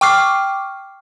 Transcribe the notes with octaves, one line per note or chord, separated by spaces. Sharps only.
G5 C#6 D6 F6 C7